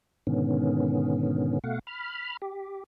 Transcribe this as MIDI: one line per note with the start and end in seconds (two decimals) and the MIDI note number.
0.27 1.59 44
0.27 1.59 47
0.27 1.59 50
0.27 1.59 51
0.27 1.59 59
0.27 1.59 61
1.64 1.79 47
1.64 1.79 57
1.64 1.79 77
1.64 1.79 78
1.87 2.37 83
1.87 2.37 89
2.42 2.84 67